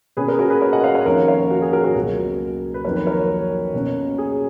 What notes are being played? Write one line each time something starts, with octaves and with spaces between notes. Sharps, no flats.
B2 A#3 C#4 G#4 B4
A#4 C#5
G#4
F#4 A#4
G#4 B4
A#4 C#5
D#5 F#5
C#5 F5
C#5 F5
F2 D#3 A#3 C#4 A#4 C#5
C#5 F5
F#4
G#4
F#4 A#4
F#4 A#4
C#2 B2 F#3 A#3
B4
F2 D#3 F#3 A#3 A#4 C#5
B4
A#4 C#5
B2 A#3 C#4
G#4